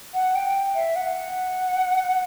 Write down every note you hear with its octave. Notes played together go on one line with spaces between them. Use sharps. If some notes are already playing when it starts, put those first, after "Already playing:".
F#5
G5
E5
F#5